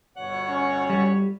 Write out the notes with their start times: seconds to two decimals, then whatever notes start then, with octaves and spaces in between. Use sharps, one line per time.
0.17 G1 B2 C#5 F#5
0.49 C#4
0.90 G3